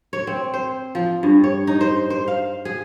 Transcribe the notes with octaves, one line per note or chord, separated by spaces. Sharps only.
C#5
C4
C5
F3
G2
C#5
D#4
C5
C5
F5
G#4